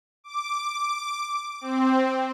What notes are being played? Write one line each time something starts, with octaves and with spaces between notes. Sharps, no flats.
D6
C4